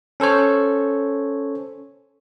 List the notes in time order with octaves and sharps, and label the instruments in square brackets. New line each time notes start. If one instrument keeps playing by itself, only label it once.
[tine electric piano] C#4 A4 C5 C#5